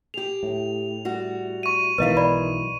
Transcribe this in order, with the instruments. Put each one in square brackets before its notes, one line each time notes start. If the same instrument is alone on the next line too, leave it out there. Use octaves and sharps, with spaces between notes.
[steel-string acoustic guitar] G4 G#4 [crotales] F7
[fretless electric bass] A2
[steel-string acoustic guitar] G3 F#4
[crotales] C#6 D#7
[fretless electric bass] B1 B2 E3 [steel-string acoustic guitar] D#3 G#3 [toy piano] B4 D#5 F5
[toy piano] D5 B5